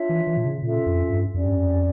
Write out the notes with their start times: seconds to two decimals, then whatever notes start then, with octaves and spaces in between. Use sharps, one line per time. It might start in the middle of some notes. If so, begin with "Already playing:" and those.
Already playing: D4 F4 C#5 E5
0.09 E3
0.27 E3
0.37 A#2
0.45 C#3
0.62 A#2 C#4 F4 A4 E5
0.86 F2
1.10 G2
1.34 F2 C#4 G4 D5
1.45 G2
1.56 F2